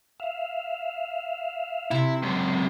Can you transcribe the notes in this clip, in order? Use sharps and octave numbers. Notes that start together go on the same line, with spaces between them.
E5 F5
C3 E4
C#2 F#2